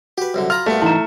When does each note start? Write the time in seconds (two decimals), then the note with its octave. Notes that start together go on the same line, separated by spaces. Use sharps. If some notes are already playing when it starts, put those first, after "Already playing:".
0.18 F#4 G4 B4
0.34 C2 F#2 D3
0.50 F4 A#5 B5 F6
0.66 G2 A#2 A3 B3
0.82 G#2 E3 D#4 E4 A#5